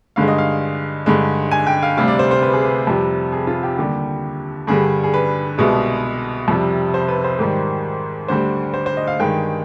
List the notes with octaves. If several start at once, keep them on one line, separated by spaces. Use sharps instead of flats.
G2 D3 G#3 F5
D#5
F5
G2 D3 G#3
G#5
G5
F5
D2 C3 G3 F5
D5
C5
C5
B4
G#4
B4
F2 C3 G3
G#4
F4
G4
D#2 D3 G3 G4
G2 D3 G3 G#4
G#4
B4
C2 B2 G#3
F2 C3 G3
C5
B4
C5
G#2 D#3 G3
D2 D3 G3 C5
C5
C5
D#5
F5
G2 D#3 G#3 G5